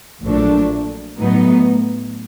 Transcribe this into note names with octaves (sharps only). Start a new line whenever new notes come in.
A#1 A#2 F#3 A3 D4
A2 F#3 B3 D#4